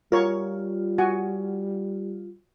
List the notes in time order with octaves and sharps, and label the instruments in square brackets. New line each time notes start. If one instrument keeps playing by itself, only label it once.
[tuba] G3 [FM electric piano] F4 [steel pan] A#4 C#5 C#6
[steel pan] F#4 F#5 G#5